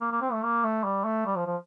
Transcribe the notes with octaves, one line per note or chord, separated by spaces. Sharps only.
A#3
A#3
C4
A3
A#3
A3
G3
A3
G3
F3
F3